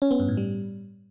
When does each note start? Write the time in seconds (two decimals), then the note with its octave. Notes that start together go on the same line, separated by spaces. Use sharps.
0.02 C#4
0.11 B3
0.20 G2
0.28 A2
0.37 G3